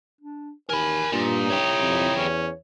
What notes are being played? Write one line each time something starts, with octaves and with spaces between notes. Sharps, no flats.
D4
D#2 E3 A#4 G#5 B5
G2 A#2 D#4 F4
E4 G4 C#5
F2
E2 C#4